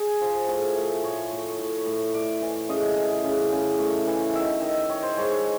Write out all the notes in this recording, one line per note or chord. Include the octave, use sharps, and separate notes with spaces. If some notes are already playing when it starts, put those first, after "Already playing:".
Already playing: G#4
F3
A2 G#4
A3
A2 C#5
A2
A2
A2
A3 D5
E3
C#3 D#5
E3
C#3
C#3
A3
E3
D#3 E5
D#3
D#3 C#5
C5
G#3 C#5
C#5